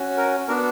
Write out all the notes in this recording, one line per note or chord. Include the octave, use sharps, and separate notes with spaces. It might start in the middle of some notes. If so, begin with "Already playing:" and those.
Already playing: C#4 F#4
A#4
B3 D4 F#4 A#4